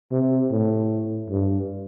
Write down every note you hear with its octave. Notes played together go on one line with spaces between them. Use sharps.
C3
A2
G2